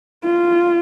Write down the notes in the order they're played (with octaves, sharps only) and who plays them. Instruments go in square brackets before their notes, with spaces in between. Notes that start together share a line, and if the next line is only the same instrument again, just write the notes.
[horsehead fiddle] F4